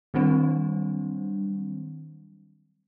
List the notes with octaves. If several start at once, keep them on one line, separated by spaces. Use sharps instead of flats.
D#3 F#3 G3 C4 D4